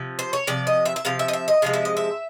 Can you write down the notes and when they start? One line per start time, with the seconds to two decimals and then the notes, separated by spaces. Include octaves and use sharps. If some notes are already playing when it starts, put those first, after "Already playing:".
Already playing: C3 F3
0.19 C5
0.33 C#5
0.47 C3 F3 D5
0.67 D#5
0.85 E5
0.96 E5
1.05 C3 F3 F5
1.19 E5
1.28 D#5
1.33 E5
1.48 D#5
1.62 C3 F3 G#3 F5
1.73 E5
1.85 D#5
1.97 E5